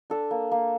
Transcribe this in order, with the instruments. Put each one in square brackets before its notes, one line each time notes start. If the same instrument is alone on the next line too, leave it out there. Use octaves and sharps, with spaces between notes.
[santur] D4 A4
A#3
A#3